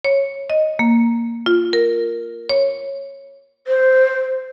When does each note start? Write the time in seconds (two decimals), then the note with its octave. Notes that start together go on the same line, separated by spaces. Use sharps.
0.05 C#5
0.50 D#5
0.79 A#3
1.46 F4
1.73 A#4
2.49 C#5
3.67 C5